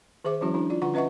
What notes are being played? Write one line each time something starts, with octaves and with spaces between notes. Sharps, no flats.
D#3 G#4 C5 E5 D6
F3 G3 C#4 E4 F#4
D4 E4 F#4
F4 D5
D3 F4 F#5 A#5 C#6
C#4 B4 D#5 E5 F#5 C#6